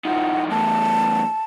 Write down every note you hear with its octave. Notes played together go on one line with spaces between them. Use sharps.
D#3 F3 F#5
E2 A2 A5